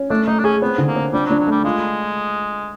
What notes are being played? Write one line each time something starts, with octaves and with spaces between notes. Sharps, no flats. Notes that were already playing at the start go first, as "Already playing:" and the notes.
Already playing: C#4
A3 D4
A3 D#4
D4
C#4 G#4
B3 C4
D3
A#3
C4
G3 D4
F#3
D4
F#3
G3 A3
G#3 F4